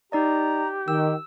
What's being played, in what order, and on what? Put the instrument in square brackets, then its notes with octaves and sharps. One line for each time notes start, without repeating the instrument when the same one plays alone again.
[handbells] D#4 D5 D#5 [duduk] G4 [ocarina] A#5
[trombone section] D#3 [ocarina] G5 [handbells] E6